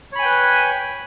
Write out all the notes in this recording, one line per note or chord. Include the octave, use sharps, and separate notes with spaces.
B4 C#5 G5 G#5 B5